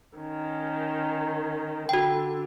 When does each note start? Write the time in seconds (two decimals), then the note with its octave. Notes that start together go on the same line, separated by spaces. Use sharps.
0.18 D#3 C#4
1.89 D3 F#4 G5